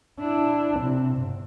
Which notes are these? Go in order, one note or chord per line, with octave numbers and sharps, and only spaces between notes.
D4 E4
C3
G1